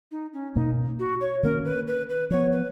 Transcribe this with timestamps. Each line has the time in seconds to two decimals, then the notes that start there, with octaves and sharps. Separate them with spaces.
0.11 D#4
0.33 C#4
0.55 B2 A#3 C#4 D#4
0.99 F#4
1.20 C#5
1.43 D#3 A#3 C#4 A#4
1.65 B4
1.87 B4
2.09 B4
2.30 F3 B3 C#5
2.52 B4